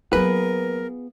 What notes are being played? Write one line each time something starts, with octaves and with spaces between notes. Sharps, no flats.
F#3 A#3 B3 F4 G#4 A#4 B4